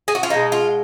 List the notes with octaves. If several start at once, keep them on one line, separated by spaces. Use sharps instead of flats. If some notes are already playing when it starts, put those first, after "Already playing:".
G#4
F#4
F4
B2 G#3 D#4
F4